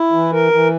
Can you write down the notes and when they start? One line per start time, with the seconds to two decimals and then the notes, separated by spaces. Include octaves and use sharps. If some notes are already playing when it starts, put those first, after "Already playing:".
Already playing: E4
0.12 E3
0.32 A#4
0.52 E3